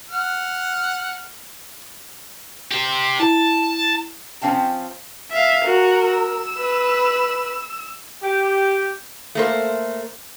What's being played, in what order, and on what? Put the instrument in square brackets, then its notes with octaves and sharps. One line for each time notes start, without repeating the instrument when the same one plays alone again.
[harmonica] F#5 F6
[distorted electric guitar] G4 C5
[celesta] E4 [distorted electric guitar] A5
[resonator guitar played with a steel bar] F3 C4 C#4 F5 G5 A5
[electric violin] E5 F5
[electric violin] F#4 [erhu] A#4
[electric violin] E6
[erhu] B4
[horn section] G4
[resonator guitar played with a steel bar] A3 A#3 C5